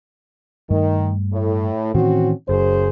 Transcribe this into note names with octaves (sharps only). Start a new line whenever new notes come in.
G2 D#3 G3 A3
A2
A2 D#3 E3 C4 C#4 F#4
F#1 F#2 G#4 C5